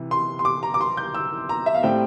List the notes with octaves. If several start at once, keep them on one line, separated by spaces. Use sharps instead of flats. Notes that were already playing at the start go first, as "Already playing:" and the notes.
Already playing: C3 E3
C6
C6
D6
A#5
D6
C6
G6
E6
A#5
E5
F5
A2 G3 C4 G5